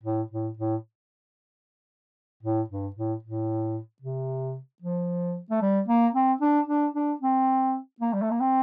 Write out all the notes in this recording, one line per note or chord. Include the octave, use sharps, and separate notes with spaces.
A2
A2
A2
A2
G2
A2
A2
C3
F3
A3
G3
A#3
C4
D4
D4
D4
C4
A#3
G3
A3
A#3
C4